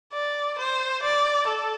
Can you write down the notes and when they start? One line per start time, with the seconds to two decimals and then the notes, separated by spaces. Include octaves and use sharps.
0.13 D5
0.58 C5
1.03 D5
1.47 A4